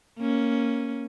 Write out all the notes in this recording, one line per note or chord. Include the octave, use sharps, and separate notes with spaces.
A#3 C#4